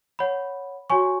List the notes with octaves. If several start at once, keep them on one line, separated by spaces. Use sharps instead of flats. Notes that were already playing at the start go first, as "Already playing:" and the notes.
C#5 F#5 B5
F#4 C#5 G#5 C#6